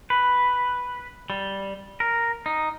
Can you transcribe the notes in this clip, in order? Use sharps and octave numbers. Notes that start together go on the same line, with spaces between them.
B4
G3
A#4
D#4